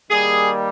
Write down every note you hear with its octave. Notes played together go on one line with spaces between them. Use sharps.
D#3 G3 A#3 G#4